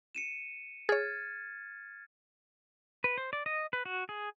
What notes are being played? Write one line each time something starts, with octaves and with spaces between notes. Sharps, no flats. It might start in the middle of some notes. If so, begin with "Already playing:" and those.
C#7 D#7 E7
G#4 C#5 F6 G#6 A6
B4
C5
D5
D#5
B4
F#4
G#4